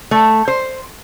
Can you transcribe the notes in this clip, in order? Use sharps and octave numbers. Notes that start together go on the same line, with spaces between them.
A3
C5